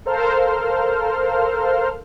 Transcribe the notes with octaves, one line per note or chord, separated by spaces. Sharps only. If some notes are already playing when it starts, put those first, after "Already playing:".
A4 A#4 C5 F5 F6